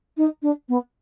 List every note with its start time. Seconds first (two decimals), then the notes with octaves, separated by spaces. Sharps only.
0.17 D#4
0.42 D4
0.68 B3